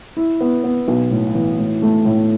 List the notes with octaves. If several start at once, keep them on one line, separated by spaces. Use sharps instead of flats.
E4
B3
B3
B1
A2
E3
A2
A3
A2